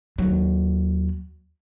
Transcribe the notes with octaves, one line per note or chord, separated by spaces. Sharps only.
D#2 F#3